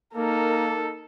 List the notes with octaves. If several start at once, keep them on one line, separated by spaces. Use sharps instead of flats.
A#3 D#4 A4 A#4